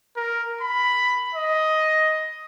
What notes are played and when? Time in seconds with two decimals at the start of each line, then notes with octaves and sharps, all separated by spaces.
0.16 A#4
0.61 B5
1.35 D#5